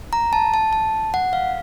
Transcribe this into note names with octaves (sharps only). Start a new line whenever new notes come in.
A#5
A5
A5
A5
F#5
F5